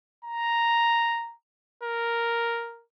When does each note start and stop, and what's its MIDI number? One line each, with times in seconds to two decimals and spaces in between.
0.25 1.34 82
1.83 2.84 70